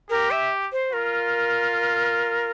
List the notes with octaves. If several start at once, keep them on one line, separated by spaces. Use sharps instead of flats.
G4 A#4
E5
C5
F4 A#4